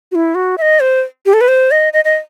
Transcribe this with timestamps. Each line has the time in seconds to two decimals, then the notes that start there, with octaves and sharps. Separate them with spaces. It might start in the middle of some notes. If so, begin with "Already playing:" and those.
0.12 F#4
0.15 E4
0.35 F#4
0.58 E5
0.62 D#5
0.80 C5
1.26 G4
1.34 A4
1.41 B4
1.48 C5
1.71 D#5
1.93 D#5
2.05 D#5